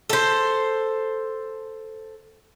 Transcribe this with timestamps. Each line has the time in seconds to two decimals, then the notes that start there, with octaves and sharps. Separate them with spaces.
0.10 A4 C5